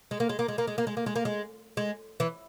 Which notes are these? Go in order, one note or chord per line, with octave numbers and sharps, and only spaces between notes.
G#3
A#3
G#3
A#3
G#3
A#3
G#3
A#3
G#3
A#3
G#3
A#3
G#3
G#3
E3